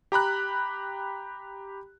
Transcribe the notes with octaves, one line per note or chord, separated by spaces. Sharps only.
G4 A#5 B5 F#6